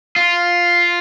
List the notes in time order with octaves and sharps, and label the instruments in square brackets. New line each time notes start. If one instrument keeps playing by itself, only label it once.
[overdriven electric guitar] F4